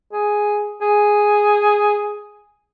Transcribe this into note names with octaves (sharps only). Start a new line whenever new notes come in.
G#4
G#4